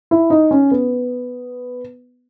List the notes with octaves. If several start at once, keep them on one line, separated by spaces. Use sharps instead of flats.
E4
D#4
C#4
B3